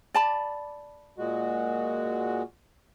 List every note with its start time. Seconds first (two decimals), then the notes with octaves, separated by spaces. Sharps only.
0.14 D5 A5 B5
1.18 A#2 G#3 F#4